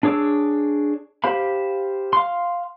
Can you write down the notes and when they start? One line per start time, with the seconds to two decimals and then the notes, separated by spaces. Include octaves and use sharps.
0.03 D4 G#4 C#5 D6 E6
1.24 G4 C5 F5 B5
2.13 F5 C6